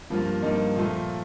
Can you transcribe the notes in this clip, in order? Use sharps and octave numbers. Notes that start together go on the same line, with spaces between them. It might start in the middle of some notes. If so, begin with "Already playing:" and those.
G2 F3 A#3 F4
G2 F3 A#3 D#4
A#2 F3 A3